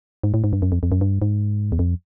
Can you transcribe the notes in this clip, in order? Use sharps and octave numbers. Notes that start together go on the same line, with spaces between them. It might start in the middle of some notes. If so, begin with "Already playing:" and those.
G#2
A2
G#2
G2
F#2
F2
F2
F#2
G2
G#2
E2
F2